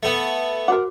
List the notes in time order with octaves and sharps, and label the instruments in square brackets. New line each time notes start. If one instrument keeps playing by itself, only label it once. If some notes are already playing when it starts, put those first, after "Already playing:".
[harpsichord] A3 B3
[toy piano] F#4 C5 D6 [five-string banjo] A#4 F#5